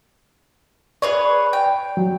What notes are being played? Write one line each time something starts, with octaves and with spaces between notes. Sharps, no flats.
G#4 B4 C#5 D5
G5
F#3